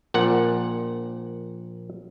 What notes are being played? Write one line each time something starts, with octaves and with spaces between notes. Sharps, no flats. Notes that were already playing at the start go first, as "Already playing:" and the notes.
A#1 A#2 F#5